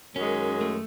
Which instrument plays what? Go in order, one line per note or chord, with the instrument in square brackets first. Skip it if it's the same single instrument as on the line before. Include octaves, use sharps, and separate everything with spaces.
[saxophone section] F#2 D#3 G#3 [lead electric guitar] C#4
[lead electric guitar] A3